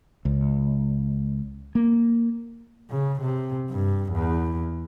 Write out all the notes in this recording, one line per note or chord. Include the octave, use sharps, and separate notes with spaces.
C#2
A#3
C#3
C3
G2
E2